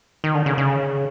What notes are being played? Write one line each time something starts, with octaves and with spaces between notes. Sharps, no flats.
D#3
D3
C#3
C#3